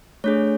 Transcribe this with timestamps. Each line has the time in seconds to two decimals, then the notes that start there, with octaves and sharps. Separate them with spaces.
0.24 A3 D4 G#4 C#5